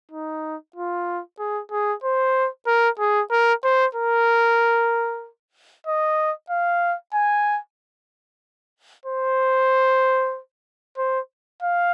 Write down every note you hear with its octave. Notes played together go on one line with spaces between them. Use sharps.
D#4
F4
G#4
G#4
C5
A#4
G#4
A#4
C5
A#4
D#5
F5
G#5
C5
C5
F5